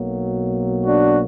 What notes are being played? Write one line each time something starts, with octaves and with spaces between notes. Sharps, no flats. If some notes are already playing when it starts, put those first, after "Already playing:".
Already playing: B1 B2 F#3 A#3
D4 F#4